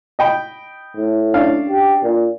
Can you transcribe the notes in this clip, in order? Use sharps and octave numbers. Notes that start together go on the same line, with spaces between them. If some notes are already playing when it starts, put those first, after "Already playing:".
D#5 G5 B5
A2
C#4 D4 F5
G4
A#2